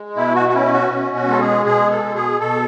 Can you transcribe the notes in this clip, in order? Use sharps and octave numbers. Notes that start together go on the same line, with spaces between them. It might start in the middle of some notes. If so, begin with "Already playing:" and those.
Already playing: G#3
B2 E4
F#4
F#4
C#4 E4
F#4
B2
F#4
G#3 A4
G#4
B2 G#4
A4
B2
G#4
B2 A4